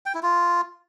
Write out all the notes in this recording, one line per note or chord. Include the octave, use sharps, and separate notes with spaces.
G5
E4
F4